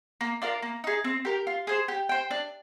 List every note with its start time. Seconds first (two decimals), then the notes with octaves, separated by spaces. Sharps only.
0.21 A#3
0.42 D4 F4 A#4
0.62 A#3
0.84 D#4 G#4
1.04 C4
1.25 G4 A#4
1.47 F4
1.67 G#4 C5
1.88 G4
2.09 C5 G5
2.31 D4